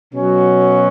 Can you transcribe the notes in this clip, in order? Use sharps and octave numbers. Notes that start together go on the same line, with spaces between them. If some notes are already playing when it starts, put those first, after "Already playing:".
B2 F#3 C#4 F#4